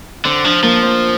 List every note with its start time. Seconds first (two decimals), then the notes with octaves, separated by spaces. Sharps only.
0.25 D3 C4
0.45 F3 D4
0.63 F3 A#3
0.82 C4